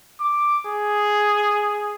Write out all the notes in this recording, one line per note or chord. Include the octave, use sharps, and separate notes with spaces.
D6
G#4